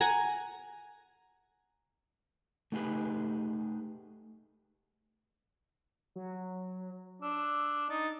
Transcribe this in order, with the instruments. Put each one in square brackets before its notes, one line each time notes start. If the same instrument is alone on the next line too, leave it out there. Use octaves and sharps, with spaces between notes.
[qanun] F#5 G#5 A#5
[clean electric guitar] A3 D#4 G4 G#4 B4
[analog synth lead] F#3
[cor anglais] D4 [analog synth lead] E6
[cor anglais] D#4 [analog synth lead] A6